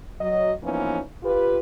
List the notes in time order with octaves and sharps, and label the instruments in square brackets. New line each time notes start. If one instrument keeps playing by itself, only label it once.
[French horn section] F#3 D#5
E3 F3 A#3 B3 C#4 D#4
F4 G4 B4